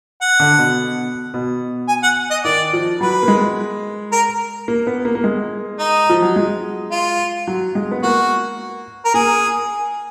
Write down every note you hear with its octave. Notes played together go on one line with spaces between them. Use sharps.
F#5
D3
B2
B2
G#5
F#5
D#5
D#3 D5
F3
F#3 B4
A#3
G#3
A#4
A#3
B3
A#3
A#3
G#3
D#4
F3
F#3
G#3
F4
F#3
G#3
B3
A#3 F#4
A#4
A#3 G#4